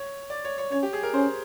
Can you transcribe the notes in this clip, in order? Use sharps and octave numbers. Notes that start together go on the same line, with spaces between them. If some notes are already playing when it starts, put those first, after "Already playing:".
Already playing: C#5
D5
C#5
C#5
C#4 C#5
G4
G#4
A#4
C#4 C5